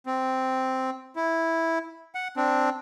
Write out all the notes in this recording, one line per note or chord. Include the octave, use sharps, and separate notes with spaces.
C4
E4
F#5
C4 D4